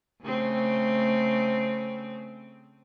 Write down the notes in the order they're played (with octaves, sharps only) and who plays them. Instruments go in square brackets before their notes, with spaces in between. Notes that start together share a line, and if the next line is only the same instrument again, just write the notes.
[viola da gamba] C#3 A3 C4